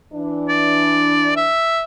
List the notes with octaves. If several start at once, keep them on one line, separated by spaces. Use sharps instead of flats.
E3 D4
D5
E5